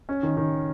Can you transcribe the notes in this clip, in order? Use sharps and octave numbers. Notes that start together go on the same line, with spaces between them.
C#4
D#3
D#3